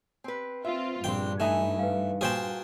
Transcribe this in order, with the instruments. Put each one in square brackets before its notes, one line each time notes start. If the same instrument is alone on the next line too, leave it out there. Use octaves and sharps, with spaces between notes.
[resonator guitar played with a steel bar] C4 B4
[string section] C4 F4 [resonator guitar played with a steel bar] E5
[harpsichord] A#1 G5 [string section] G2 [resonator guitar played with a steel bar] D3 C4
[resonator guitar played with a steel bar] E3 D#4 G#5 [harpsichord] A3
[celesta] B4 F5
[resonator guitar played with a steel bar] A#2 F#4 C5 [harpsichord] G#4 G5 A5